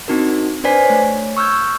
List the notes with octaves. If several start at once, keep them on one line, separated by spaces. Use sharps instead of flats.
C4 D4 D#4 F#4 A#4
D4 B4 C5 D5 G#5 B6
A3 C#5
C#6 E6 F6 G6 G#6